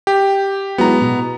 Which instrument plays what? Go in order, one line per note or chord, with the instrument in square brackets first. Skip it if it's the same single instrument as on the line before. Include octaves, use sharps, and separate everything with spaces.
[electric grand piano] G4
[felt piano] F#3 G#3 E4 [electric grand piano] B3 A#5
[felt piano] B2